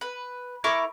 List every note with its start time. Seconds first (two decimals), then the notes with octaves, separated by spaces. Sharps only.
0.01 B4
0.64 E4 A#4 C#6 D6